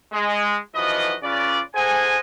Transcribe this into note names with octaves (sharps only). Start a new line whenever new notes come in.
G#3
B1 E3 F3 F#4 B4 D#5
C#3 C#4 F4 B4 D5
G#4 A4 C5 D#5 F#5 G#5